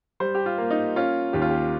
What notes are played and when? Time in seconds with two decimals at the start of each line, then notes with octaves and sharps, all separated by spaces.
0.20 G3 C5
0.35 G4
0.46 F4
0.58 A#3
0.71 D#4
0.96 C#4 F4
1.33 D#2 G4
1.42 F4
1.50 G4